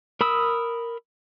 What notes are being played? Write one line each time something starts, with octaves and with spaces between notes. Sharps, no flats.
A#4 B5 D#6 E6